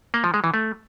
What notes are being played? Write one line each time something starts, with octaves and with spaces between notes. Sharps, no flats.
A#3
F3
G#3
E3
A3